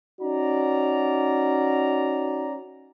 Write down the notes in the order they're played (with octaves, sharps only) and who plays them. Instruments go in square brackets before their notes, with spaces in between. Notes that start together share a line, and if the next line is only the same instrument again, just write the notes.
[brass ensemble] C#4 D#4 F#4 D5 A#5